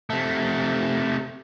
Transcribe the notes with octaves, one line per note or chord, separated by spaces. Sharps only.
C3 A3